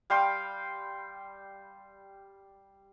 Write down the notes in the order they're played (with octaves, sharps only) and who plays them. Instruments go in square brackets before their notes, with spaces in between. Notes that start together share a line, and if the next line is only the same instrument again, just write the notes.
[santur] G3 F5 G5 C6